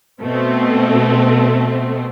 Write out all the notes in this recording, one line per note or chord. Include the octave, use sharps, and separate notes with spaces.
B2 A3 C4